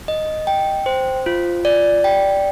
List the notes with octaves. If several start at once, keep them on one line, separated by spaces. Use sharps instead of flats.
D#5
G5
C5
F4
D5
G5